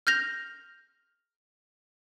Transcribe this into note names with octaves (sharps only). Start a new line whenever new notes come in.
F6 G6 A#6 F7